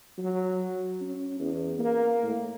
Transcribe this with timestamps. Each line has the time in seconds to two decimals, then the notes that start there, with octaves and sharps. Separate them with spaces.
0.18 F#3
1.01 C#4
1.40 E2
1.79 A#3
2.22 A2